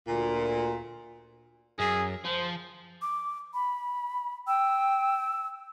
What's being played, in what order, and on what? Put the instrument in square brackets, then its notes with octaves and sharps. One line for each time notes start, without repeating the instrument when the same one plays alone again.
[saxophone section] D2 A#2
[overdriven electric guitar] F#2 [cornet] G#4
[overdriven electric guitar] F3 [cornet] C5
[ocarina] D6
B5
[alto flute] G5 [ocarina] E6